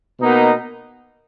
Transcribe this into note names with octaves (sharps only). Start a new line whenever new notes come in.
B2 A#3 D#4